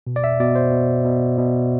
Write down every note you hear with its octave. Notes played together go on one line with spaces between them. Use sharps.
B2
D5
E5
B2 D5
C5
B2
B2
B2